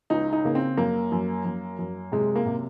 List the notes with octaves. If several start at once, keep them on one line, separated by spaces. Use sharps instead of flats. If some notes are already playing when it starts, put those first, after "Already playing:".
C#2 D#4
D#4
C#3 A#3
C4
F#2 A#3
F#2
F#2
F#2
C3 G#3
A#3
C3